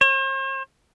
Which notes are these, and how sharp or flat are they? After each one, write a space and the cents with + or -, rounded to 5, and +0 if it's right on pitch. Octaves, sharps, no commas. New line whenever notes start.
C5 +45